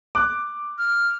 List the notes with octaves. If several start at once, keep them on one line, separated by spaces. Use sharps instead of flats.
D6 F#6
F6